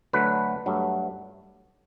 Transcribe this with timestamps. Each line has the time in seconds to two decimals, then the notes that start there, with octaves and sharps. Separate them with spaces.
0.13 D2 D3 F#3 A3 B4
0.66 G2 F#3 A3